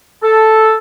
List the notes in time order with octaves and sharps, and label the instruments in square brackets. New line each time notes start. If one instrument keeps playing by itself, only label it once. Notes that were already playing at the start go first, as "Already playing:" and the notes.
[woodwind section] A4